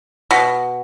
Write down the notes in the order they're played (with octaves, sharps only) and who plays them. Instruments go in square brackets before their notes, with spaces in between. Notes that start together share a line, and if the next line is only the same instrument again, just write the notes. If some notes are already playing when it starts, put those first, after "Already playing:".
[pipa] B2